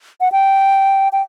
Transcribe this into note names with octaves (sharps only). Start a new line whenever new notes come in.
F#5
G5
G5